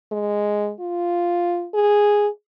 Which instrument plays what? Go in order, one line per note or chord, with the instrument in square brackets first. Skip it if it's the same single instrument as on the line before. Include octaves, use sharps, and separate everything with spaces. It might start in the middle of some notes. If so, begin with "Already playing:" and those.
[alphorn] G#3
F4
G#4